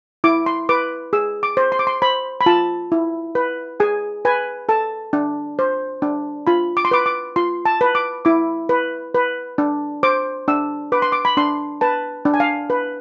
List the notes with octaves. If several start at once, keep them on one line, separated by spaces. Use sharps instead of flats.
E4 D6
C6
B4 D6
G#4 E6
D6
C5
C6
D6
C6
C5 B5
B5
F4 A5
E4
B4
G#4 G#5
B4 G#5
A4 A5
D4
C5
D4
F4 B5
D6
C6
B4 D6
D6
F4 C6
A5
B4
D6
E4 D6
B4
B4
D4
C5 D6
D4 E6
B4 D6
C6
D6
B5
D4 C6
B4 A5
D4
G#5
F5
B4